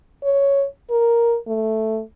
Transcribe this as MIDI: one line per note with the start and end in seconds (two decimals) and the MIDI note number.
0.24 0.65 73
0.90 1.37 70
1.47 2.01 57